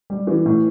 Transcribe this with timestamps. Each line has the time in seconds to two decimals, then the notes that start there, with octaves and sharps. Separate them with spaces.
0.10 G3
0.27 E3
0.46 A2